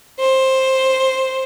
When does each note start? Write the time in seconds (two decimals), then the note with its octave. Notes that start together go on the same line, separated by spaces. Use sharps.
0.20 C5